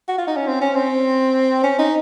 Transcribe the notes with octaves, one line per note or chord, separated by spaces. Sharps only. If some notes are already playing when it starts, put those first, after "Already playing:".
F#4
F4
D#4
C#4
C4
C#4
C4
C#4
D#4